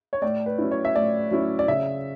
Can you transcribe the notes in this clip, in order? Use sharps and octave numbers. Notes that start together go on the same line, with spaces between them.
C#5
A2 D5
B4
F#3 C#4 E4
C#5
E5
A2 D5
F#3 C#4 E4
D5
C#3 E5